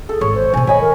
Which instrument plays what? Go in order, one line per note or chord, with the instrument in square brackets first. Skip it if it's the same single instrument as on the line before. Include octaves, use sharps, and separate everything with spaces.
[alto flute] G#4 [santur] A4
[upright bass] G#1 [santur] C#5
[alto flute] C5
[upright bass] B2 C4 [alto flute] G#5
[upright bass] D#3 [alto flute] C#5 [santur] D#5 G#5 B5
[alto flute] A#4